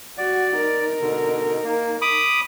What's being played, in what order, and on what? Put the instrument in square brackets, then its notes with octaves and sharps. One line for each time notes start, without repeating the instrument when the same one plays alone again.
[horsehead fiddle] F#4 [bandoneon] D5
[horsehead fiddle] D#4 A#4
[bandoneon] B2 D3
A#3
B5 D6 D#6